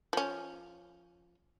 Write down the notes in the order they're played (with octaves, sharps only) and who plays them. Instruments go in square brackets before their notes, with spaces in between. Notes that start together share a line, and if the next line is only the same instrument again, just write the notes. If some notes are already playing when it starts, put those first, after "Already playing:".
[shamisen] F3 C#4